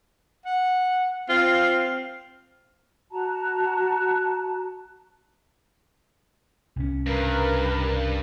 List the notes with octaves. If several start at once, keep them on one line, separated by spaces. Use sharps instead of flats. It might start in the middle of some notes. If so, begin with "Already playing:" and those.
F#5
C4 F4 F5
F#4 A5 A#5
C2 B2 C#4
G2 A#4 B4